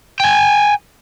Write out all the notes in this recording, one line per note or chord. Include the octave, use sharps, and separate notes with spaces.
G5 G#5